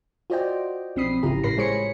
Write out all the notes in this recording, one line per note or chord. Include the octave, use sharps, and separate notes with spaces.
F4 F#4 C5 D5 D#5 G5
B1 F3 C4 B5 D#6 C7
G#1 C#3 E4 F4 G4 A#5
A2 A#4 B5 A#6 C7
G#3 G#4 C5 C#5 B5 C#7